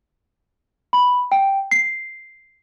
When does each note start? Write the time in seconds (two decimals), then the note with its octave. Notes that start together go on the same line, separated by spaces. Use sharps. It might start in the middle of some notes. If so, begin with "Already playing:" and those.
0.93 B5
1.32 G5
1.71 C7